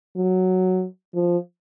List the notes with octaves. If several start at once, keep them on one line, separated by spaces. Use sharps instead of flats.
F#3
F3